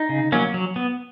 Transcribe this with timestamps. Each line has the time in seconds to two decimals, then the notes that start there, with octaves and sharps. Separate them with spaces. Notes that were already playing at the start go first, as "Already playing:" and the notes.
Already playing: D#4
0.09 C#3
0.32 F#3 A#3 C#4
0.54 F#3
0.76 B3